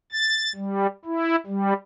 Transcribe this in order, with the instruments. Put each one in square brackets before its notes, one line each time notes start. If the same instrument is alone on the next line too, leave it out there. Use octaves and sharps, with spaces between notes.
[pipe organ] A6
G3
E4
G3